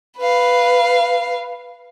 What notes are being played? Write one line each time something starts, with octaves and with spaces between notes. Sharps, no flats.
B4 F5